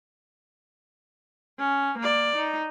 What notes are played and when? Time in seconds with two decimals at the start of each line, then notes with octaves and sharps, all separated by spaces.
1.59 C#4
1.98 A#3 D5
2.36 D#4